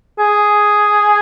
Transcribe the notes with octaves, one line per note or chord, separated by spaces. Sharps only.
G#4